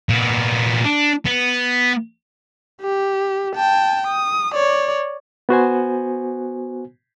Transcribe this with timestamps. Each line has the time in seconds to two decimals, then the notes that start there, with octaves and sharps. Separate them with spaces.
0.09 A#2 B3
0.85 D4
1.26 B3
2.82 G4
3.55 G5 A5
4.07 D#6
4.54 C#5 D5
5.49 B3 F#4 C5 G#5